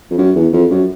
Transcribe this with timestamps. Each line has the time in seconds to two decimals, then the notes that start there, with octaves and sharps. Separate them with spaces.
0.11 F2
0.18 F#2
0.35 E2
0.53 F2
0.70 F#2